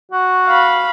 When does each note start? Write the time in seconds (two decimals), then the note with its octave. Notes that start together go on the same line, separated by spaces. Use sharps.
0.12 F#4
0.48 F5 B5